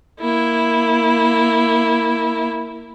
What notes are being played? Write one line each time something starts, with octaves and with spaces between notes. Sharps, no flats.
A#3 E4